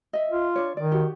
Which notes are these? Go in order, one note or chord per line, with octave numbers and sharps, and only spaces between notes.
D#5 E5
F4
D4 C#5
D#3 D5
F#4 G4